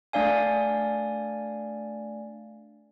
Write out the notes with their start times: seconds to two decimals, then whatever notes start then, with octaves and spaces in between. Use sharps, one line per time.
0.13 A3 D4 D5 F5 G#5